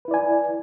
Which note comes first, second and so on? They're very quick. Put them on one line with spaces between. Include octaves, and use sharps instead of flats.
B4 E4 D5 G#5